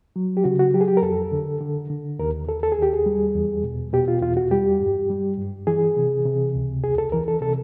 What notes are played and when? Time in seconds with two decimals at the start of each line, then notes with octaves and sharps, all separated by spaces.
0.16 F#3
0.37 G4
0.44 C#3 F#4
0.59 F#4
0.74 F#3 G4
0.81 G#4
0.88 G4
0.97 A#4
1.02 F2 A4
1.32 D3
1.61 D3
1.90 D3
2.19 D#2 A#4
2.48 D#2 A4
2.63 A4
2.72 G#4
2.78 D#2 G4
2.93 G#4
3.06 G3
3.35 E2
3.64 B2
3.93 B2 G4
4.08 F4
4.22 E2 F4
4.37 F#4
4.51 G3 G4
4.80 G2
5.10 G3
5.38 G2
5.67 E3 G#4
5.97 C3
6.25 C3
6.55 C#2
6.83 E2 G#4
6.98 A4
7.12 E3 A#4
7.28 A4
7.41 C3 A4